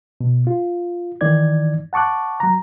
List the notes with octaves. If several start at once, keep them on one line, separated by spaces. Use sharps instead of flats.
B2
F4
D#3 E3 D#4 D5 G#6
F#5 A5 C#6 D6 F#6
F#3 A#5